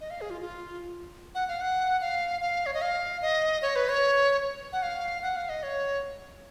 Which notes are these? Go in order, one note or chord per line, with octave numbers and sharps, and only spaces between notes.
D#5
F5
G#4
F4
F4
F#5
F5
F#5
F5
F5
C#5
D#5
F5
D#5
C#5
B4
C#5
F#5
F5
F#5
F5
D#5
C#5